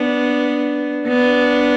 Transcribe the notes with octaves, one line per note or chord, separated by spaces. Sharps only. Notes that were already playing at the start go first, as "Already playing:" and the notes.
Already playing: B3 D4
B3 D4